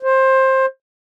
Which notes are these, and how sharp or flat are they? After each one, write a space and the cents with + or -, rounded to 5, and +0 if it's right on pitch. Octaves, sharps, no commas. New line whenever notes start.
C5 +20